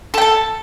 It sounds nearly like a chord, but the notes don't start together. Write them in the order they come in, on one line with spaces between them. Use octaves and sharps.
A4 G5 A5